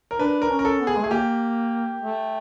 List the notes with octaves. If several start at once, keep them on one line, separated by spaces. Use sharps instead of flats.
A#4
D4 B4
A#4
C#4
A#4
A4
B3
G#4
G#3
A3 G#4
A#3 G4
A3